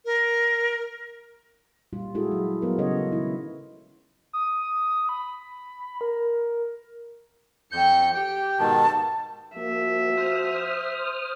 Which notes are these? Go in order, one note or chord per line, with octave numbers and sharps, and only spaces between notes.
A#4
A#2 G3 F4
G#3 A3 E4 F#4 G#4 A4
F#3
F#3 B3 F4 A#4
C#3 F#3 A4 C#5 D#5
D#3 E4
D#6
B5
A#4
F2 G5 G6 C#7
G4 G5
G#2 B2 D#3 A5
F3 A#3 F#4 E5
C5 D#6 F6